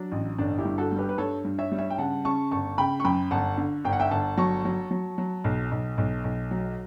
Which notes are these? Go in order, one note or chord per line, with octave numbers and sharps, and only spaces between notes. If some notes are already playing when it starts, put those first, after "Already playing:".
Already playing: F#3 D4
A1
G1 D4
E4 G4
G2
F#4 A4
G3
G4 B4
B4
G2 A4 C#5
G2
C#5 E5
G3
C#5 E5
G5
C#3 F#5 A5
C#3 A5 C#6
G1 A5 C#6
C#3 G5 B5
C#6
F#2 G5 B5
G1 F#5 A5
D3
G1 G5
F#5
E5 G5
G1 F#5 A5
F#3 A5 C#6
F#3
F#3
F#3
B1
B1
B1
B1
F#3